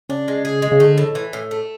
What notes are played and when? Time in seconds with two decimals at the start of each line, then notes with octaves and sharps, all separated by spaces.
0.09 C#3 D4
0.28 G#3
0.45 G#4
0.62 G#3
0.72 C#3
0.80 D3 A3
0.98 A2
1.15 E3
1.33 A2
1.51 A3